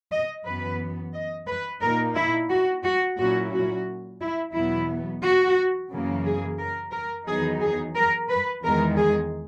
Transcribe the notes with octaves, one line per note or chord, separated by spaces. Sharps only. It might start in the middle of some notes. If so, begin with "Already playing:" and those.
D#5
F#2 E3 B3 B4
D#5
B4
A#2 A#3 D#4 A#4
E4
F#4
F#4
A#2 F#3 C#4 E4 F#4
F#4
E4
E2 B2 F#3 B3 E4
F#4
F#2 C#3 E3 A#3
G#4
A#4
A#4
E2 D#3 F#3 B3 D#4 G#4
G#4
A#4
B4
E2 D#3 G#3 A#4
G#4